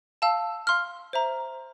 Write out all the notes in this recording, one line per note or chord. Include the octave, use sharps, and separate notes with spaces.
F5 A5 E6
F5 C6 F6
C5 E5 A#5